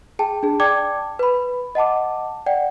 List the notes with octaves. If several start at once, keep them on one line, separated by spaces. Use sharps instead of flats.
G#4 G5 A5
D4 G#4
D5 G5 A5 D6 G#6
B4 B5
D#5 F#5 A5 D6
D5 F#5 G5